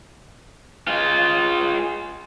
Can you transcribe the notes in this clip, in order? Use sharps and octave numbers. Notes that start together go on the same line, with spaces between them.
G#3 F4